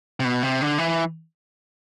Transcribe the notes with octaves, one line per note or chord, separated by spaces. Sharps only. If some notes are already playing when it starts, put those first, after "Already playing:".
C3
B2
C3
D3
E3